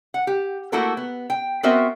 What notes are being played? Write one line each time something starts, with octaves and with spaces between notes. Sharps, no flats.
F#5
G4
A3 A#3 E4 F#4 A4 A#4
B3
G5
B3 C4 F#4 A#4 C5 E5